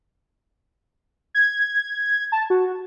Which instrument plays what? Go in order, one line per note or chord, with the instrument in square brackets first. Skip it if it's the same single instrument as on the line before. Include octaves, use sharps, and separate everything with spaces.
[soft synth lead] G#6
A5
F#4